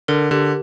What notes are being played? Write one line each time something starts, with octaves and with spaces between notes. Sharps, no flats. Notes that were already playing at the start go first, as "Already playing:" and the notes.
D3 A#4
D3 G4